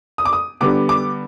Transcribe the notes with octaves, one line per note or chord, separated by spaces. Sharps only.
D#6
D6
D#6
D3 G3 B3 D6
D6